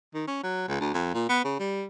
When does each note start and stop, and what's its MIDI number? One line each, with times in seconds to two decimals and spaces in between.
0.14 0.24 51
0.28 0.43 61
0.44 0.65 54
0.68 0.79 37
0.81 0.90 38
0.94 1.14 41
1.14 1.26 46
1.29 1.44 59
1.45 1.59 49
1.60 1.86 55